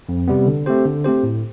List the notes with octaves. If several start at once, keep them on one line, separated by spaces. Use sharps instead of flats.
F2
C3 G3 B3
D3
A3 C4 G4 C5
D3
A3 C4 G4 C5
A2